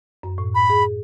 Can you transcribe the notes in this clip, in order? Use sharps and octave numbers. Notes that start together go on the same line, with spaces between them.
F#2
A2
B5
G#4